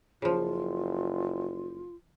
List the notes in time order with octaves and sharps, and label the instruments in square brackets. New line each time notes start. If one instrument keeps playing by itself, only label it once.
[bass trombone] F#1 [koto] C#3 F3 [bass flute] F4